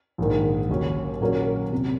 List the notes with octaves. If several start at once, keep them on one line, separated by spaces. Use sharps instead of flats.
A#1 G#2 D#3
D#2 C#3 F#3 C#4
A#2 F#3 A#3 C#4
C3